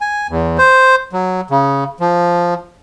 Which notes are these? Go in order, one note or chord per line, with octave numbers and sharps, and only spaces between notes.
G#5
E2
C5
F#3
C#3
F3